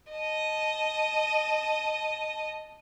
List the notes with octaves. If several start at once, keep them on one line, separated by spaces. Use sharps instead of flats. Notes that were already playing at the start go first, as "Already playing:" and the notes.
D#5 A5